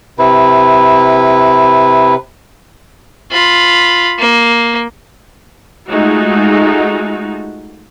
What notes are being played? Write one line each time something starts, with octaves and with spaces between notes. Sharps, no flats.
C3 E4 B4
F4 B5
A#3
G#3 A3 D#4 F4 F#4